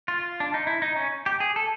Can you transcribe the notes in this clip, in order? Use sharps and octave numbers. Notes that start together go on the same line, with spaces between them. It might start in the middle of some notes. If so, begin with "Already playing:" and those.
F4
D4
D#4
E4
D#4
C#4
G4
G#4
A4